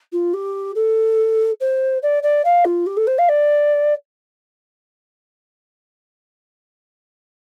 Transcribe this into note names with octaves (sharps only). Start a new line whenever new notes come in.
F4
G4
A4
C5
D5
D5
F5
F4
G4
A4
C5
F5
D5